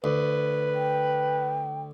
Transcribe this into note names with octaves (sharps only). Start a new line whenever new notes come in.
D2 B4
G5